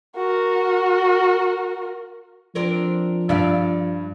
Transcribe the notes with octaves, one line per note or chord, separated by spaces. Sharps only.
F#4 A#4
F3 C4 D4 A#4
G2 D5 E5 F5